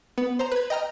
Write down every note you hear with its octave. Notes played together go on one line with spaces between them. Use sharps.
B3
C5 A#5
B4 G#6
D#5 G5 A#5 F6